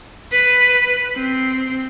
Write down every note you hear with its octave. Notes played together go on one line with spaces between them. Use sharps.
B4
C4